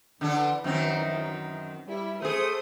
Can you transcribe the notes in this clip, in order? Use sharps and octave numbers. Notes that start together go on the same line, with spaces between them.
D3 E3 D4 A4
F#2 D#3 C4
G3 E4
A3 G#4 A4 C5 D#6